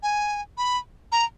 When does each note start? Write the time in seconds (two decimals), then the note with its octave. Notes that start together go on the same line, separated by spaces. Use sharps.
0.03 G#5
0.58 B5
1.12 A#5